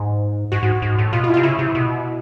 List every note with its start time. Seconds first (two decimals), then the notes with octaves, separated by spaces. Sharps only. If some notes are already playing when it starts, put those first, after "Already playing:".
Already playing: G#2
0.52 G#2 F#4
0.63 G#2
0.82 G#2
0.98 A2
1.13 B2 F4
1.24 F4
1.29 E4
1.34 F4
1.37 C3
1.43 C#3 E4
1.59 C3
1.75 B2